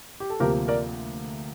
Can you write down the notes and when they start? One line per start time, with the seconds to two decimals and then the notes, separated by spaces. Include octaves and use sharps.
0.20 G4
0.30 A4
0.40 D2 C3 F3 A#3 G4 A#4
0.68 A#4 D5